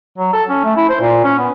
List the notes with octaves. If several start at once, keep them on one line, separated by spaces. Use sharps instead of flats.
F#3
A4
C#4
A3
E4
C5
A#2
C#4
B3